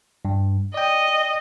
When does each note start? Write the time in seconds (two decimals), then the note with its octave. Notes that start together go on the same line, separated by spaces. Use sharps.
0.25 G2
0.74 D5 D#5 G5